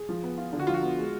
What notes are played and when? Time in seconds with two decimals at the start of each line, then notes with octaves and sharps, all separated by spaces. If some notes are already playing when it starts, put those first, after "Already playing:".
Already playing: G#4
0.09 F3
0.23 B3
0.38 F4
0.52 D3
0.59 F#4
0.67 F3 F4
0.74 F#4
0.82 B3
0.98 G#3